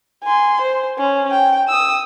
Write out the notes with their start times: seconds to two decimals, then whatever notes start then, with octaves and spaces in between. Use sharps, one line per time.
0.24 G#5 C6
0.62 C5
0.98 C#4
1.31 G5
1.68 D#6 E6